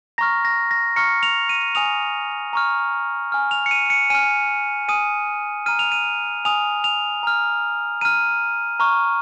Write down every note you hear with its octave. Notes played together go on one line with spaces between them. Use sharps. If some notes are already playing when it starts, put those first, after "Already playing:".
A#5 C#6 F6 A#6
A#6
A#6
A#5 C#6 F6 C#7
F7
D#7
G#5 D#6 F7
A#5 C#6 F6
G#5 F6
F7
C#7
D#7
C#7
G#5 F6 D#7
G#5 D#6 D#7
A#5 F6 D#7
F7
D#7
G#5 D#6 F7
F7
A#5 F6
A#5 F6 D#7
A#5 C#6 F6